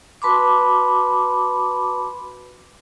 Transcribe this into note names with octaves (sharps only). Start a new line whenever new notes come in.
F#4 B4 A5 B5 C6 D6